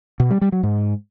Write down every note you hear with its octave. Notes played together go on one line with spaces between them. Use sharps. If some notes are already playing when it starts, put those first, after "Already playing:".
B2
G3
G3
F#3
G#2